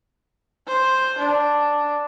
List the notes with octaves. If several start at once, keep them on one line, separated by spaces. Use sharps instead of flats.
C5
D4